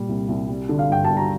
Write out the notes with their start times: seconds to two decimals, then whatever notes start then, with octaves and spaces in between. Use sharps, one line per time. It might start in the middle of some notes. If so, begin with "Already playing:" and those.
Already playing: A#2 G3
0.09 C2
0.28 C2
0.49 G3
0.69 D3
0.79 F5
0.90 G2 G5
1.05 A5
1.10 G2
1.17 A#5